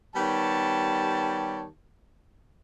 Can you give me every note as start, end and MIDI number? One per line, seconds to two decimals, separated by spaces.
0.15 1.65 51
0.15 1.65 55
0.15 1.65 59
0.15 1.65 67
0.15 1.65 73
0.15 1.65 81